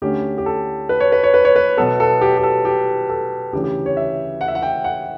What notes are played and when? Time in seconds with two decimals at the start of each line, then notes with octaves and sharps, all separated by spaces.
0.02 D2 D3 A3 C#4 G4
0.38 G4
0.46 A4
0.89 B4
1.00 C#5
1.12 B4
1.23 C#5
1.34 B4
1.45 C#5
1.56 B4
1.77 B2 F#3 B3 A4
2.00 A4
2.21 G4
2.38 G4
2.43 A4
2.65 G4
3.09 A4
3.53 D2 C#3 E3 G4
3.64 G4
3.86 C#5
3.97 E5
4.41 F#5
4.48 E5
4.55 F#5
4.62 G5
4.84 F#5